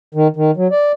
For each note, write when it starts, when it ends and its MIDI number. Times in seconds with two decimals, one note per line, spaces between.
0.15 0.28 51
0.36 0.51 51
0.57 0.68 54
0.72 0.92 74